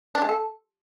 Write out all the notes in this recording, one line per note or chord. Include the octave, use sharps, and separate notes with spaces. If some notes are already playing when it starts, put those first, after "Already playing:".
D4
G#3
A4